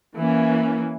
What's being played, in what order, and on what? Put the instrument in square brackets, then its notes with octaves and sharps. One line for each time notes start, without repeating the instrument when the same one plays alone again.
[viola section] E3 A#3 C#4